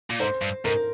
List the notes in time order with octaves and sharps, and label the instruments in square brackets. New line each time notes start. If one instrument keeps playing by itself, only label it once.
[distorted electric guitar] A#2
[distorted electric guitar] G#2 [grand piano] C5
[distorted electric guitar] G2
[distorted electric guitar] G#2 [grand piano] A#4